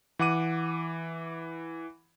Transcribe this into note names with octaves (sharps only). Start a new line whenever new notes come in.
E3 F#5 D6 D#7